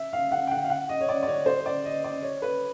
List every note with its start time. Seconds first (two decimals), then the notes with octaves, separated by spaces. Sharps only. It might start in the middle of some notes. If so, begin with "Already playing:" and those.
Already playing: E5
0.13 F5
0.32 F#5
0.47 G5
0.51 F#5
0.64 F5
0.70 F#5
0.89 D#5
1.01 C#5
1.09 D5
1.23 D5
1.28 C#5
1.46 C5
1.66 D5
1.85 D#5
2.04 D5
2.22 C#5
2.42 B4